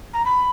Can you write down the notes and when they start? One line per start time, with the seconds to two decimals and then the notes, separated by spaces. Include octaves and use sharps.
0.13 A#5
0.24 B5